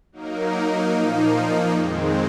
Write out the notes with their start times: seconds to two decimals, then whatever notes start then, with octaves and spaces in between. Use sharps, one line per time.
0.12 F#3 A#3 D#4 A#4
0.91 A#2 F3 A#3 D#4
1.71 F2 D#3 G#3 C4